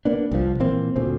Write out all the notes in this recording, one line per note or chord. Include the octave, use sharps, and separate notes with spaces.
A#3 B3 D4
C2 F3
A#2 E3 A#3 C4
D2 A#2 C4